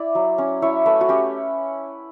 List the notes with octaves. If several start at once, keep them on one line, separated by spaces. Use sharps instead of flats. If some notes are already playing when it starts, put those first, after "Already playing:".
Already playing: E4 D5
F#3
C#4
E4 C#5
A3 B4
F#4
C#4 G4